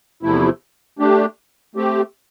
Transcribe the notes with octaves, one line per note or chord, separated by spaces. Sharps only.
E2 C3 F3 A3 E4
A3 D4 G4
A3 C4 G4